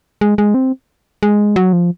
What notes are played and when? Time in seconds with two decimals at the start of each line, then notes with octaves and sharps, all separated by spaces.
0.21 G#3
0.38 G#3
0.54 C4
1.23 G#3
1.56 F#3
1.73 F3